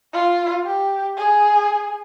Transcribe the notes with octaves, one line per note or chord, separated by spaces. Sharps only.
F4
G4
G#4